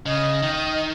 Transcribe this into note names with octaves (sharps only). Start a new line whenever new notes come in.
C#3 D#5
D#3